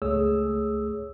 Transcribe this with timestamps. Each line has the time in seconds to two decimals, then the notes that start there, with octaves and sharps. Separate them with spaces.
0.02 C#2 A3 G#4 C#5 D#6 E6